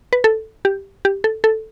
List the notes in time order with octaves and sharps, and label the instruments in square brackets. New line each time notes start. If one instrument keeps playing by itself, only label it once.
[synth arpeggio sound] B4
A4
G4
G4
A4
A4